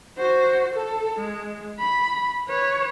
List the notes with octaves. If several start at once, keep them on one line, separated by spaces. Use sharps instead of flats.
F#4 C5
A4
G#3
B5
B4 C#5